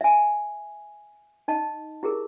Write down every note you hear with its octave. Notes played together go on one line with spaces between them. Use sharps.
E5 G#5
D#4 D#5 A5
E4 G4 G#4 A#4